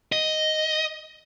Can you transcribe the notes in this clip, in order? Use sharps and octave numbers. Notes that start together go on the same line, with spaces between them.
D#5